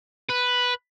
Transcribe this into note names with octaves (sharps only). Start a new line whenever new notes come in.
B4